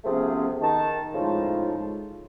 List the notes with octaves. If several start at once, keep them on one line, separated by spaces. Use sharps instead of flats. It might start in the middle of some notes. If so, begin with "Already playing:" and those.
C3 F3 A3 B3 C#4 G#4
D#3 A5
A2 C#3 F3 G#3 D#4 F4